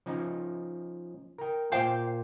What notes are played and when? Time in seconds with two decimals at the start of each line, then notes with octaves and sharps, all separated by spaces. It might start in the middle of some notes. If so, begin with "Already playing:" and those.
0.06 F3 C#4 D#4
1.38 A#4 G5
1.72 A#2 F4 C5 F5 G5